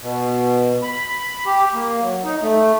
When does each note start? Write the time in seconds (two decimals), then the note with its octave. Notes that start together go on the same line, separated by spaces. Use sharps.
0.01 B2
0.83 B5
1.46 G4
1.74 A#3
2.02 F#3
2.24 D#4
2.43 A3